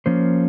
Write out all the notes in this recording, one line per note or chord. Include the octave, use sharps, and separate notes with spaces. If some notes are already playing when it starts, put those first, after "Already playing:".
F3 A#3 C#4 C5